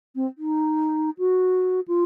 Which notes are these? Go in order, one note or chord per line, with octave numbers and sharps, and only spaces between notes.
C4
D#4
F#4
F4